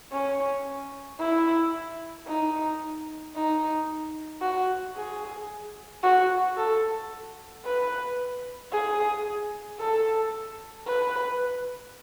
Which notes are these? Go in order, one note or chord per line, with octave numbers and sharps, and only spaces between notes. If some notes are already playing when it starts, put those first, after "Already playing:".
C#4
E4
D#4
D#4
F#4
G#4
F#4
A4
B4
G#4
A4
B4